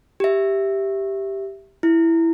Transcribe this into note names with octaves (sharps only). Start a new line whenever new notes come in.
G4 E5
E4